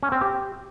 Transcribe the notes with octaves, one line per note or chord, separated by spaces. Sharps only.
C#4
C4
G4